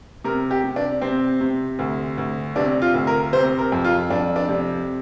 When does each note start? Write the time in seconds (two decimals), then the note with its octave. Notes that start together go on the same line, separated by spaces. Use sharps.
0.25 C3 A#4
0.51 G4
0.64 C3
0.76 D4
1.01 C3 C4
1.41 C3
1.79 D2
2.18 D2
2.56 C3 D4
2.82 F4
2.94 D2
3.07 A#4
3.33 C3 C5
3.58 A#4
3.72 F2
3.84 F4
4.10 F2 D4
4.36 D4
4.49 C3